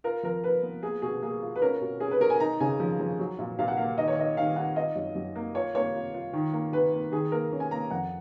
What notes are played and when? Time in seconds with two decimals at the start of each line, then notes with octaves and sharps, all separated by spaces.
0.04 F4 A#4
0.23 F3 A#4
0.44 F4 B4
0.63 B3
0.83 A#3 G#4
1.02 B2 G#4
1.22 A#3 G#4
1.42 F4
1.56 B4
1.62 C#4 A#4
1.81 B2
2.00 C#4 G#4
2.11 B4
2.21 B2 A#4
2.30 G#5
2.40 D#4 A#5
2.60 C#3 G#5
2.80 F3
3.00 F3
3.19 F#3
3.39 A#2
3.59 A#2 F5
3.68 F#5
3.77 A#3 F5
3.98 D#3 D#5
4.08 C#5
4.17 D#3 D#5
4.37 D#3 F5
4.56 D#4 F#5
4.76 F4 D#5
4.96 F#2
5.15 F#2
5.35 A#3
5.55 F4 C#5
5.75 A#3 C#5
5.95 F4
6.14 F4
6.33 D#3
6.53 A#3
6.72 D#3 B4
6.93 A#3
7.12 D#3 G#4
7.32 A#3 A#4
7.52 C#4
7.60 G#5
7.71 A#3 A#5
7.91 F2 F#5